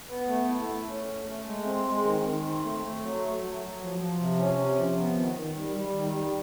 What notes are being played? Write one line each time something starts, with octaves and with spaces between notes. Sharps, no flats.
B3
A3
E4
A3
C#4
A3
A3
G#3
C4
G#3
D#3
D#3
C4
A3
A3
F#3
A3
F#3
F#3
F3
F3
C3
C#4
C3
F3
B3
D#3
D#3
G3
G3
D#3
G3